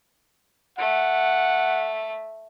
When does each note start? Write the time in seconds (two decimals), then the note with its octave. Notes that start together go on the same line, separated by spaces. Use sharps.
0.78 A3 F#5